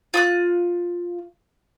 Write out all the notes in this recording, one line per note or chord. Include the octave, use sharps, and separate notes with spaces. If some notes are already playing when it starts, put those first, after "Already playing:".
F4 D#6 F#6